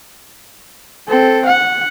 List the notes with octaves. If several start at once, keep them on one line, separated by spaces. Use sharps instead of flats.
C4 A4
F#5